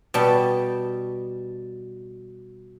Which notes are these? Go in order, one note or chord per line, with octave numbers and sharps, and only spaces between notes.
B2 G3 A5